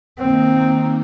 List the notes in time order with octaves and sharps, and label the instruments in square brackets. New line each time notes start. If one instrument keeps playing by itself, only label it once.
[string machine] D#3 A#3 D#4 [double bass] C4